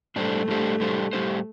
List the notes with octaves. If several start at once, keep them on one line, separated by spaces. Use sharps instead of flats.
A2 G3 A3 D4 G4 C5
A2 G3 D4 G4 C5
A2 G3 D4 G4 C5
A2 G3 D4 G4 C5